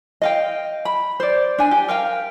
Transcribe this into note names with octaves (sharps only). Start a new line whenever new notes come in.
D#5 F5 G5
B5
C5 D5
D4 G#5
G4
A#4 F5 G5